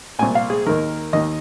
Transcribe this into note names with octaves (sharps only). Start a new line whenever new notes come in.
C2 A#2 G#5
F5
G#4
D#2 D#3 A#4
D#2 D#3 D#5